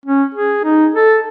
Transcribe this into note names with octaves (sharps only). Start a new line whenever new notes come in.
C#4
G#4
D#4
A4